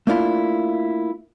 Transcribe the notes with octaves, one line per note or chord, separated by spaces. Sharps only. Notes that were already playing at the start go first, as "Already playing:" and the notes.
A3 A#3 D4 E4 F4